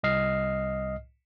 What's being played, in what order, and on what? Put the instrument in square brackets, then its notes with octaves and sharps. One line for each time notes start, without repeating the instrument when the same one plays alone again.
[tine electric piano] C2 D#5 F6 C7